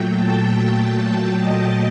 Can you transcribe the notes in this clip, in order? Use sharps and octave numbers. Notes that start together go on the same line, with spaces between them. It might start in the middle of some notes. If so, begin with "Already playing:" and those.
Already playing: A#2 F#3 A3 G5
A5
G5
G5
D#5